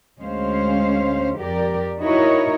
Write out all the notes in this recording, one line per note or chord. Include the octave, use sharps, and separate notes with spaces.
D2 G#3 C#4 C5 F5
F2 G4 A#4 D5
D#4 E4 F#4 A#4 C#5 D#5